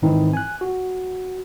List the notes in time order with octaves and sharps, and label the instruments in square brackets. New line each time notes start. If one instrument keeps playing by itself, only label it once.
[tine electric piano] G#2 D#3 E3 C4 D#4 E4
G#5 F#6
F#4